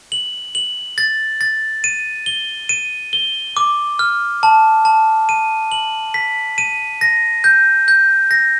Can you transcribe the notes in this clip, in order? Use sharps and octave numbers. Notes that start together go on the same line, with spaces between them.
F#7
F#7
A6
A6
D#7
G7
D#7
G7
D6
F6
A5
A5
D#7
F#7
B6
D#7
A#6
G6
G6
A#6